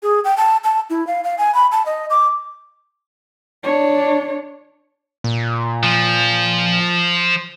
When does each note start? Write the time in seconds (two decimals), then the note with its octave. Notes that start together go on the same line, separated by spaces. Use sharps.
0.03 G#4
0.24 G5
0.37 A5
0.64 A5
0.90 E4
1.07 F5
1.24 F5
1.38 G#5
1.54 B5
1.72 A5
1.86 D#5
2.10 D6
3.63 D4 C#5
5.24 A#2
5.83 F3